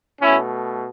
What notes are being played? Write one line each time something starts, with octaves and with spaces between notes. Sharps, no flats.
B2 A3 C#4 E4